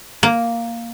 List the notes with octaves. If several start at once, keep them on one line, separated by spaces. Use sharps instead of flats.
A#3